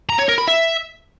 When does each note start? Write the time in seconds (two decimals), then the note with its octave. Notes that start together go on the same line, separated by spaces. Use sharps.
0.10 A#5
0.19 C#5
0.29 A#4
0.38 B5
0.48 E5